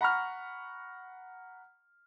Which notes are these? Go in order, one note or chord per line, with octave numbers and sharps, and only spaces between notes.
F#5 A#5 B5 C#6 F6